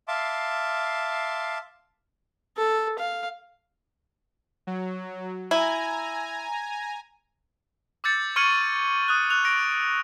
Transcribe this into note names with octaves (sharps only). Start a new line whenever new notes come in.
E5 F5 A5 C6 D6
A4
F5
F#3
E4 G#5 A#5
D6 E6 G6 A6 C#7
C#6 F6 G#6 C#7 D#7 F#7
D#6 F#6
E6 F#6 F7
A#6 D7